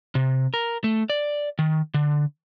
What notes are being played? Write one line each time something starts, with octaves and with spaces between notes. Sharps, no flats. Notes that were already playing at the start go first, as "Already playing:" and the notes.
C3
A#4
A3
D5
D#3
D3